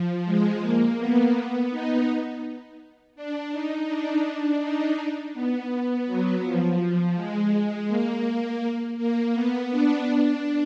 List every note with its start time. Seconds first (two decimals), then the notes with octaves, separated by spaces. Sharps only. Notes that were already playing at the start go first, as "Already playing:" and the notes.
Already playing: F3
0.25 G#3
0.61 A#3
0.98 B3
1.70 D#4
3.16 D4
3.52 D#4
3.88 D4
4.61 D#4
5.34 B3
6.06 F#3
6.43 F3
6.79 F3
7.15 G#3
7.52 G#3
7.88 A#3
8.97 A#3
9.34 B3
9.70 D4
10.07 D4